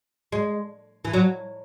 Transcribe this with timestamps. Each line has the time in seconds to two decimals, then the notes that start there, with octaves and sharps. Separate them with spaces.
0.32 G#3
1.05 E3
1.13 F#3